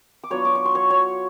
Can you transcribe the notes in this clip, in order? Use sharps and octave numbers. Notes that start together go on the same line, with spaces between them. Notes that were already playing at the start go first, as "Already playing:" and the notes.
D6
F#3 B3 D4 F4 C#5 C#6
D6
C#6
C6
C#5 C#6
C#5 C#6